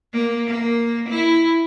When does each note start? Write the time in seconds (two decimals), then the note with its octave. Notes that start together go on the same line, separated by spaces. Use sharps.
0.13 A#3
0.47 A#3
1.09 E4